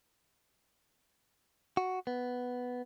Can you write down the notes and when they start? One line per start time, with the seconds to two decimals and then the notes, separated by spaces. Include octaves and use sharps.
1.77 F#4
2.07 B3